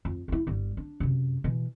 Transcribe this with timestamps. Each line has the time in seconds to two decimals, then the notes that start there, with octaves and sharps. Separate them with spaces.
0.05 F2
0.28 D#4 E4
0.47 G1 G3
0.77 D4
1.00 F#2 C3
1.44 B2 E3